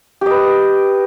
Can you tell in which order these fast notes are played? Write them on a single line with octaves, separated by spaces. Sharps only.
G4 D#5 B4